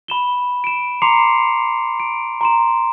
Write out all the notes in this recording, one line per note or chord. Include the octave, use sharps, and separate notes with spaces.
B5 E7 G7
D7 E7
A#5 C6 D6 C7 C#7 F7
D7
A#5 C6 E7